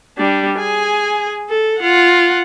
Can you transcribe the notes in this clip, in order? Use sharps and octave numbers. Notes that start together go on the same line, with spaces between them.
G3 D4
G#4 G#5
A4
F4 F#5